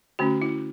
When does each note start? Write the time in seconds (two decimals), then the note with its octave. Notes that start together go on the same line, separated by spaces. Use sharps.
0.19 D3 A3 C#4 F#4
0.42 E4